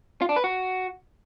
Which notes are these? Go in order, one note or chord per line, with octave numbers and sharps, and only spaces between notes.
F4
D4
B4
F#4